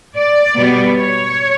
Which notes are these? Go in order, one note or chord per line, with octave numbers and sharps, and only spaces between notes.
D5
B2 G3 B3
C#5